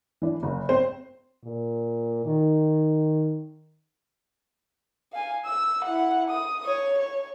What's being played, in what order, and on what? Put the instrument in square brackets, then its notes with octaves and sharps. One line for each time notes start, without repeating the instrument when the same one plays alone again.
[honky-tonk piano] E3 D4
F#1
C4 C5
[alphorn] A#2
D#3
[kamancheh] F5 G#5
E6
E4 F#5
D#6
C#5
C#5